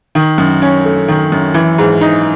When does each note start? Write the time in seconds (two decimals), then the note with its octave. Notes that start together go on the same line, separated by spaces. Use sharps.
0.15 D#3
0.38 F#2
0.62 C#4
0.85 A3
1.08 D#3
1.32 F#2
1.54 E3
1.78 G#2
2.01 D#4